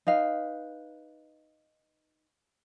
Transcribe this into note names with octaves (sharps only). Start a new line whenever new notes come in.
D#4 B4 F5